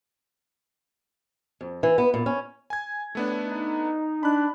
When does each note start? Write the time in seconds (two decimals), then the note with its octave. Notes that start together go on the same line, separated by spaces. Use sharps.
1.61 F2
1.83 E3
1.98 B3
2.14 A#2
2.26 C#4
2.70 G#5 G#6
3.15 A2 A3 B3 D4
3.46 D#4
4.23 D4 B5 F#6